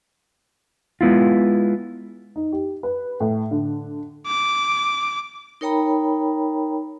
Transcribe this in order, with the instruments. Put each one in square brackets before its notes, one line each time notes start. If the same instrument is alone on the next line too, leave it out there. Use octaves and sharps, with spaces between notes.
[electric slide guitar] G#3 B3 E4 F4
[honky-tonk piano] D#4
G4
B4
A2
D3
[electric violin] D6
[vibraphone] D#4 A#4 C#5 G5 A#5 B5